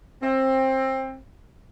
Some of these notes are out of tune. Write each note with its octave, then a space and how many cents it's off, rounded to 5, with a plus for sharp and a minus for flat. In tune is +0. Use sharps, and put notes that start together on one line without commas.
C4 +20